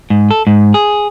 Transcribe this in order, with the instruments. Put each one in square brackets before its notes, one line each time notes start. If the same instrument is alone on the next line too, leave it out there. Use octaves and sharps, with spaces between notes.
[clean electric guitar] G#2
A4
G#2
G#4